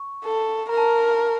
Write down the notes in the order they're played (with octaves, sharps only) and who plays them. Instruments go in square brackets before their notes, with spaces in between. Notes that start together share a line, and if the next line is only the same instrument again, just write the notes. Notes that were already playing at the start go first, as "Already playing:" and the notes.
Already playing: [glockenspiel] C#6
[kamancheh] A4
[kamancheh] A#4 [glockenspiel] A#5
[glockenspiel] A5
A#5